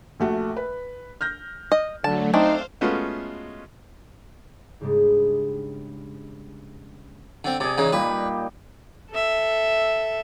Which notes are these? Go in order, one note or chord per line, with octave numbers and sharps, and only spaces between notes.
A#1 A3 F#4
B4
F6 G6 A#6
D#5
D3 F#3 A3 A5
A3 C4 D4 D#4 C5 F5
G#3 A3 B3 C#4 F4 F#4
G#2 C#3 G3 G#3 B3 D4
D3 C4
C3 G#4 D5
C#3 E3 D#4
A#2 G3 B4
A4 E5